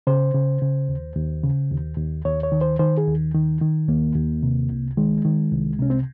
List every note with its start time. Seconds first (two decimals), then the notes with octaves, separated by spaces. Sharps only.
0.07 C#3 C5
0.34 C#3
0.61 C#3
0.89 D#2
1.16 D#2
1.43 C#3
1.71 D#2
1.97 D#2
2.25 D#2 C#5
2.43 C#5
2.52 D#3
2.61 C5
2.79 D#3 C5
2.97 G#4
3.07 D#2
3.34 D#3
3.61 D#3
3.89 D#2 A#3
4.16 D#2
4.43 C3
4.70 C2
4.97 D#3 G#3
5.25 D#3
5.52 C2
5.79 C3 C#4
5.90 C4